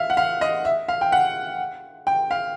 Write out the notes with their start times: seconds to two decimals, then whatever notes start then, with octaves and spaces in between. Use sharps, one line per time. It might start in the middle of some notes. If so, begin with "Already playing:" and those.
Already playing: E5 F5
0.10 F#5
0.17 F5
0.41 D#5
0.65 E5
0.88 F5
1.01 G5
1.12 F#5
2.07 G5
2.31 F5